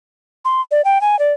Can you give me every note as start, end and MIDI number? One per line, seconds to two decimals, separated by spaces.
0.45 0.61 84
0.71 0.82 74
0.85 1.01 79
1.01 1.18 80
1.19 1.33 74